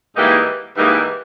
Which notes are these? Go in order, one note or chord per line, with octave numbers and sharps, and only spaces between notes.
G#2 E3 G3 A#3 D#4
G#2 E3 G3 A#3 D#4